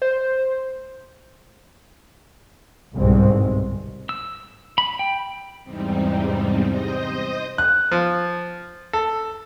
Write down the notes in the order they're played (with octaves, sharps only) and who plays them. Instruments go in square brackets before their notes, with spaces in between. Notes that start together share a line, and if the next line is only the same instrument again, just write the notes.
[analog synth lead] C5
[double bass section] G1 C2 G#2 B2 G#3 C4
[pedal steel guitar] E6
B5
G5
[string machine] E2 G#2 C3 G3 C4 D#4
C5 D#5 D#6 G6 A#6
[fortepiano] F#6
F3
A4